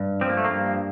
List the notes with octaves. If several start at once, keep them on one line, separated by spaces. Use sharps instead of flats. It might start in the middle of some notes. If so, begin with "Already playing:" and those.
Already playing: G2
F3 C4
A#3
A3
A#3
G2